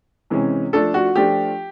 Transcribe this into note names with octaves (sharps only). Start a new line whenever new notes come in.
C3 E3 G#3 C#4
F3 A3 D4 F4 A4
F#4
F3 A3 D4 F4 G4